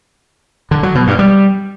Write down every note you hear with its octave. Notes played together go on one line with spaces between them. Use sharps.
D3
F#3
B2
G2
G3